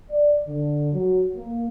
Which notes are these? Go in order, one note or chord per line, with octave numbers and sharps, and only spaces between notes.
D5
D3
F#3
A#3